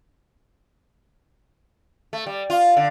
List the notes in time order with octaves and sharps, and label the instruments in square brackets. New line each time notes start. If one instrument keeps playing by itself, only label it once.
[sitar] A3
G3
F4
D3